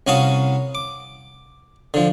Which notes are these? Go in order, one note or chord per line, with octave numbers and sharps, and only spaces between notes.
C2 C#4 F#4 F5 A5 D#6
D6
D3 F3